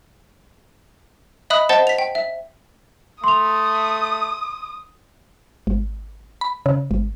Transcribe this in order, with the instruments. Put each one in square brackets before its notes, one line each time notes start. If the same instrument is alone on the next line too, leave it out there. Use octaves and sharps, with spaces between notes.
[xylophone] D#5 E5 B5 D#6 F#6
C5 D#5 F#5 A5 A6 G7
B6 F7
G5
E5
[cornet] A3 [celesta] C6 F7 [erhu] D#6
[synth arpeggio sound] G#1
B5
C#3
G#1